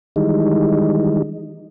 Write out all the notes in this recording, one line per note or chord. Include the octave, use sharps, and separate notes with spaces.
D#3 E3 G3 G#3 D#4